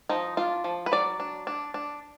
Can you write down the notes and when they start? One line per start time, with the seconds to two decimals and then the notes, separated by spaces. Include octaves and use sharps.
0.09 F3 D#4
0.37 D4 F4
0.64 F3
0.86 B4
0.92 F#3 D5
1.20 D4
1.47 D4
1.74 D4